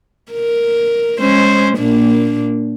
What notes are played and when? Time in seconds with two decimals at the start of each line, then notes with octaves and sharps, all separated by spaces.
0.33 A#4
1.20 G#3 C#4 C5
1.77 A#2 A#3 D4